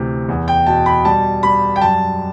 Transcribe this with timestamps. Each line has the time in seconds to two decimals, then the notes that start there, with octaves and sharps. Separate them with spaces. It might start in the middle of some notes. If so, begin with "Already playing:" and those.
Already playing: D2 C3 E3
0.29 E2
0.48 G5
0.66 B2 A5
0.86 B5
1.05 G3 A5
1.43 G3 B5
1.76 G5
1.82 F#2 A5